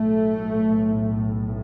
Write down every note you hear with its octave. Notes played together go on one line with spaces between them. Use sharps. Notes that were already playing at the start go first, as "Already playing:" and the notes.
Already playing: B1 A2 A3